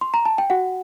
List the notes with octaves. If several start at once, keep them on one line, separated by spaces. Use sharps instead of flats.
C6
A#5
A5
G5
F#4 F#5